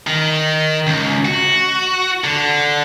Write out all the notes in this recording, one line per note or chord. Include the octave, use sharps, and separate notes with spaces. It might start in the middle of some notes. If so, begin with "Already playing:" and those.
D#3
C#2
F#4
D3